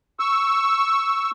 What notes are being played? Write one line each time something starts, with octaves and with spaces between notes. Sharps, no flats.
C#6 E6